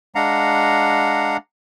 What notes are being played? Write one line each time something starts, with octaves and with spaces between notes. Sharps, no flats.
G#3 D4 F5 F#5 A#5